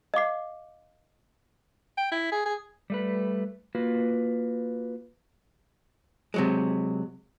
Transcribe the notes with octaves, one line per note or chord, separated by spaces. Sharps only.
D#5 F5 D6 C7
G5
E4
G#4
G#4
G3 A3 B4
A#3 F4 F#4 B4
C3 F#3 G#3